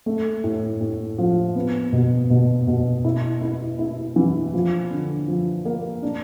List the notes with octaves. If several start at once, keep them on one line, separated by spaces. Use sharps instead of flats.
A3
A2
A2
F3
B3
B2
B2
B2
E4
E4
E4
E3
F3
D3
F3
A#3
D4